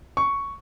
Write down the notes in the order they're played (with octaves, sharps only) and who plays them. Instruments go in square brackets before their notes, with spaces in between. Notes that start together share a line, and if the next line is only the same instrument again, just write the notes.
[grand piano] C#6